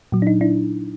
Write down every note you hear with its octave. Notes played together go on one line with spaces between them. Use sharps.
A#2 F#3
D4
D#4
D4 E4